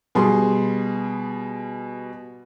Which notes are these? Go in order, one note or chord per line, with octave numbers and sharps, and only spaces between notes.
B2 G3 G#4 C6